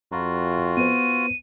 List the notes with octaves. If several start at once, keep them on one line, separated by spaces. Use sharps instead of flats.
F2 F4 F#4 A#5 B5
B3 B4 C5 D#7